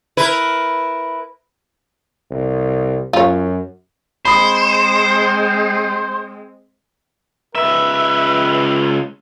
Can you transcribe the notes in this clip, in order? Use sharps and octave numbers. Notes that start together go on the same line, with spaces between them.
E4 A#4 B4
C2
F#2 F4 C#5
G#3 C4 C5 B5 D#6
C#2 B4 E5